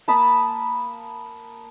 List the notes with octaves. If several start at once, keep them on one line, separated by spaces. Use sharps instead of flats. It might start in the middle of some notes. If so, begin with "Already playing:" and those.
A#3 A5 B5 D#6